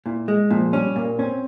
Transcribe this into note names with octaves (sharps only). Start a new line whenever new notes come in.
A#2 E4
G#3
A#2 F3
G3 C#4
A#2 A#3
C4 C#4